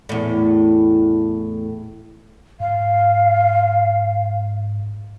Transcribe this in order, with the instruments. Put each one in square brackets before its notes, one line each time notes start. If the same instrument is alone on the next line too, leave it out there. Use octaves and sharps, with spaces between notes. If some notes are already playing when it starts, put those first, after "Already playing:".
[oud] E2 A2
[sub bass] G#2 [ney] F5